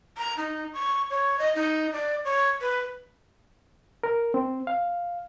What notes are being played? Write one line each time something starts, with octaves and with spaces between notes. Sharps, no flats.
A#5
D#4
C#6
C#5
D#5
D#4
D5
C#5
B4
A#4
C4
F5